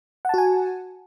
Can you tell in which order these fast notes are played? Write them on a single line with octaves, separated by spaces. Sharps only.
F#5 A5 F#4 G#5